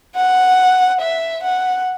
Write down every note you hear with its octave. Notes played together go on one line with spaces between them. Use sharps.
F#5
E5
F#5